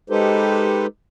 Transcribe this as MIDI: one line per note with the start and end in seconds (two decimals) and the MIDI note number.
0.10 0.86 56
0.10 0.86 63
0.10 0.86 67
0.10 0.86 69
0.10 0.86 71
0.10 0.86 72